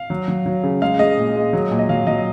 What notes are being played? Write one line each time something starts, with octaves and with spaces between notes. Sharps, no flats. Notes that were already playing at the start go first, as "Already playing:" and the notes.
Already playing: F5
F#3
F#3
F#3
C#3
G#3 F5
G#3 D#5
A#2
G#3
F#3
A#2
D#5
F#3 F5
F#3 D#5